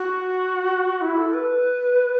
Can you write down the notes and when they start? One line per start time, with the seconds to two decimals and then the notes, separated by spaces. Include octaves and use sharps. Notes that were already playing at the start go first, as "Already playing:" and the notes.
Already playing: F#4
1.01 E4
1.17 A4
1.33 B4